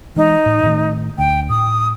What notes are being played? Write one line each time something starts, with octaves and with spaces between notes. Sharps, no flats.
E3 G#3 D#4
A2
A2 D#3 A3
D2 G5
A2 D#6